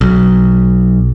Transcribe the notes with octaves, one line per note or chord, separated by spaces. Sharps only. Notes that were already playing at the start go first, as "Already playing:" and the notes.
B1